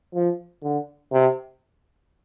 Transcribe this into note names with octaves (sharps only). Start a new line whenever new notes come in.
F3
D3
C3